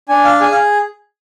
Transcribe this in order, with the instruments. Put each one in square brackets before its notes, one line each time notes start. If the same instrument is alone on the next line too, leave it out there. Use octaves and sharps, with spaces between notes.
[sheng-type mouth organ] D4 G#5
F5
G#4 G#5
F5